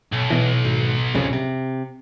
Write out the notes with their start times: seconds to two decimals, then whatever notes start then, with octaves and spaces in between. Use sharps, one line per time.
0.13 B1
0.30 B2 E3
0.65 G#1
1.14 C2 F2 C#3
1.33 C3